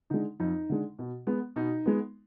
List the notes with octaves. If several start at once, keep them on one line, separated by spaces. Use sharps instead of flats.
D3 G#3 D#4
F2 D#4
D3 G#3
B2
G#3 B3
B2 D#4
G#3 B3